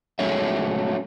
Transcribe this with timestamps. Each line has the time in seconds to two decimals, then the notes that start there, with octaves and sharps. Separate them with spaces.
0.19 F#3 G#3 A3 C#4 C#5 E5